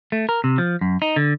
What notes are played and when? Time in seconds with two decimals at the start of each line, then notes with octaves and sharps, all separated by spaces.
0.12 A3
0.29 A#4
0.44 C3
0.58 F3
0.81 F#2
1.02 D#4
1.16 D3